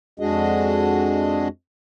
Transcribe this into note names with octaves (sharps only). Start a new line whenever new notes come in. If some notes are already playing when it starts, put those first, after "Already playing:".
F2 G#3 D4 F#4 G#4 D#5